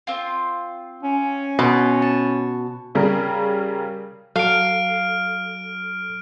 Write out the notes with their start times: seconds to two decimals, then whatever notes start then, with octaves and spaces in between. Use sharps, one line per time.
0.07 C4 F4
1.03 C#4
1.59 B2 C5
2.02 A5
2.95 C#3 G3 G#4 A#4
4.36 F#3 A4 F5 F6 D7